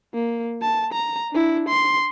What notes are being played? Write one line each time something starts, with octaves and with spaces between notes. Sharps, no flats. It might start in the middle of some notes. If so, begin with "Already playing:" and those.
A#3
A5
A#5
D4 E4
C6